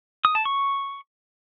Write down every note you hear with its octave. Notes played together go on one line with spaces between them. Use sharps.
D#6
A5
C#6